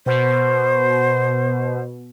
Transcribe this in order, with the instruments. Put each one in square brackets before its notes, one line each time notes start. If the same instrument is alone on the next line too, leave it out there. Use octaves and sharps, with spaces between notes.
[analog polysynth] B2 [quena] C5